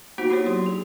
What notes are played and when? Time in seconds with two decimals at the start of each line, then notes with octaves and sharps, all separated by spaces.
0.18 A#3 B3 D#4 F#4 C5 F#5
0.30 E4 G4 C5 C#5
0.46 F#3 C6
0.66 G#4